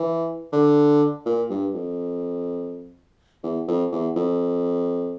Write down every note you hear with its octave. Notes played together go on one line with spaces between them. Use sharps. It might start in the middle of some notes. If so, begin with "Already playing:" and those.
Already playing: E3
D3
A#2
G2
F2
E2
F2
E2
F2